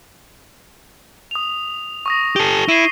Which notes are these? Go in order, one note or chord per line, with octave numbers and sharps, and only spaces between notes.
D#6 F7
C#6 D#6 A#6
G4 A4 G7
E4 C7 D#7